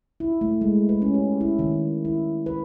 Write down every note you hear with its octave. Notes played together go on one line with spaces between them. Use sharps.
E4
A3
G#3
B4
C#4
G4
E4
D#3
E4
B4